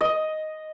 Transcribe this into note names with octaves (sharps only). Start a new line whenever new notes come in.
D#5